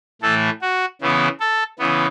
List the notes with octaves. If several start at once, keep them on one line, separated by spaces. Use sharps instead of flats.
A2 E3 A3 A4
F#4
C#3 E3 B3 E4
A4
C#3 E3 B3